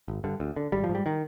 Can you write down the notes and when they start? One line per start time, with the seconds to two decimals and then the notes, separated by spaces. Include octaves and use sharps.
0.08 G#1
0.24 G2 D3
0.40 D2
0.56 D3
0.72 G#1 G3
0.84 F3
0.89 G#2
0.95 G3
1.06 D#3